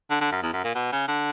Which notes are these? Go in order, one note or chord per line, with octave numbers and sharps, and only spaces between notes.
D3
D3
F#2
E2
F#2
A#2
B2
C#3
D3